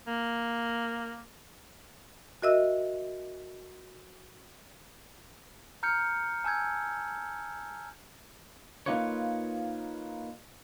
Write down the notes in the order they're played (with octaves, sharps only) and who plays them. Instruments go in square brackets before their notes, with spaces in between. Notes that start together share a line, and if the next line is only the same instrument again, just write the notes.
[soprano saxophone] A#3
[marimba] F#4 A#4 D#5 E5 E6
[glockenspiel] A#5 F6 G6 C#7
G#5 A5 E6 G6 G#6
[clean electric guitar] A#3 C4 D#4 F4 B4 C#5